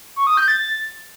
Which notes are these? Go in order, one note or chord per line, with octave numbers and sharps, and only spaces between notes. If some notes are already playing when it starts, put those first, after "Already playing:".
C#6
D#6
G6
A6